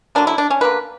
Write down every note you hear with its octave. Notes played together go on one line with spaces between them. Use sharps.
D3 F#3 A#3 D4
E4
D4
C#4
D3 F#3 A#3 B4